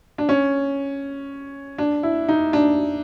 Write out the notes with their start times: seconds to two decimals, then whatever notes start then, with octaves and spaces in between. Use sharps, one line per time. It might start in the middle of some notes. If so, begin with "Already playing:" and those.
0.18 D4
0.29 C#4
1.78 D4
2.03 E4
2.29 D#4
2.53 D4